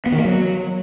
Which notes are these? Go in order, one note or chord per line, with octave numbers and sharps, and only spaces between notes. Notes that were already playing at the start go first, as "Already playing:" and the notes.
B3
D#3
A#3
F#3